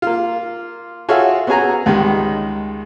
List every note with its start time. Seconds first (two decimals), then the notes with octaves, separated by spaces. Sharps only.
0.02 A#3 F4
1.09 F4 F#4 G#4 A4 C#5 E5
1.47 B3 C#4 F#4 G#4 G#5 A#5
1.86 C#2 D#3 G3 G#3